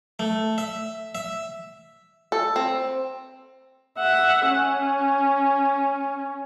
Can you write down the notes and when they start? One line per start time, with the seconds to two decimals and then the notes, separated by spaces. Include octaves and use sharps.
0.19 A3
0.58 E5
1.15 E5
2.32 A4
2.56 C4
3.99 E5 F#5
4.50 C#4